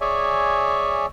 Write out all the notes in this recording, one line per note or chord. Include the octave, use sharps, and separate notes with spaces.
G#4 C#5 D5 E5 G#5